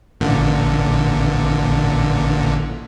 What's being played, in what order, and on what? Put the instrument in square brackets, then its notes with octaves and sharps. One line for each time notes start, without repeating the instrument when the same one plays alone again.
[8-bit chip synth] A1 A#2 D3